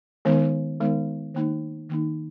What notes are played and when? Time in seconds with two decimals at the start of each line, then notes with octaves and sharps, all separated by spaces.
0.25 D#3 G#3 B3 D#4 A#4
0.80 D#3 G#3 B3 D#4 A#4
1.35 D#3 A#3 D#4
1.89 D#3 A#3 D#4